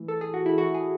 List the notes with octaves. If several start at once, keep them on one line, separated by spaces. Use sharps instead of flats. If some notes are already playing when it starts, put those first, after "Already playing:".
Already playing: A2 E3
A4
G#4
F#4
E4
F#4
G#4